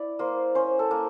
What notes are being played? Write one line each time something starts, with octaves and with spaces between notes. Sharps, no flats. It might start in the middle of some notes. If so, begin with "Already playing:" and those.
Already playing: E4 D5
A#3 C5
C#4 C5
A4
A#3